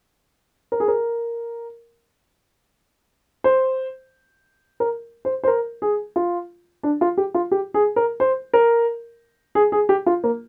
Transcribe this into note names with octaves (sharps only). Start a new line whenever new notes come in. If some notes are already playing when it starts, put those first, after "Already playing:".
A#4
G#4
A#4
C5
A#4
C5
C5
A#4
G#4
F4
D4
F4
G4
F4
G4
G#4
A#4
C5
A#4
G#4
G#4
G4
F4
A#3